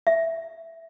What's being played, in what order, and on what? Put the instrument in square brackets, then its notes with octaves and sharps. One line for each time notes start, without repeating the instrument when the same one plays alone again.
[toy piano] E5